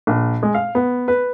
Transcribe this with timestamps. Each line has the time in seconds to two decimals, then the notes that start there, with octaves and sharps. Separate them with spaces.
0.07 A#1
0.43 G#3
0.54 F5
0.75 B3
1.08 B4